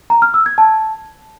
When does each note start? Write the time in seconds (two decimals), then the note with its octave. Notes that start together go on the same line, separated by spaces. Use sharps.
0.10 A#5
0.22 F6
0.34 E6
0.46 G#6
0.58 A5